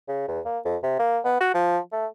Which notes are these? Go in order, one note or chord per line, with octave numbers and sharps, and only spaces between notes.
C#3
E2
A#3
F2
C3
A#3
B3
F#4
F3
A3